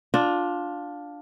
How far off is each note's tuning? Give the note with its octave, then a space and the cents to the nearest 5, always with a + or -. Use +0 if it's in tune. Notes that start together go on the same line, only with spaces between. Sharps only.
D4 +0 F4 +15